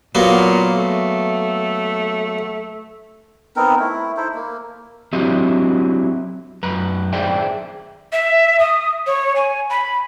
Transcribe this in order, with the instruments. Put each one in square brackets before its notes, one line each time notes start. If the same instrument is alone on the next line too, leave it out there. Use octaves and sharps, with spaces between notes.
[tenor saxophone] A#2 [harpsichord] F#3 A#3 B3
[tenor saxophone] A3
[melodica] B3 C4 D#4 A#4
A3 E4
D#4 E4 A4 C5
A#3
[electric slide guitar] F#3 C4 D4 E4 G4 D#5
F#2 B4 A#5
G#4 C5 D5 E5 G5
[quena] E5
D#6
C#5
G#5
B5